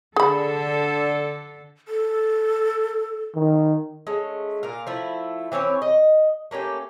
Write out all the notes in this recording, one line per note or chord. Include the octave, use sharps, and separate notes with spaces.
D3 G#4 A4 B5
A4
D#3
G#3 A3 C#4
A#2 A#4 F5
F3 A3 E4
E3 C4 C#4 C#5
D#5
A3 A#3 C#4 G4